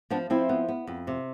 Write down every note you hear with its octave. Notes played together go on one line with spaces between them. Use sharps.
F3 B3 D4
F3 C4 E4
B3
B3
F2
C3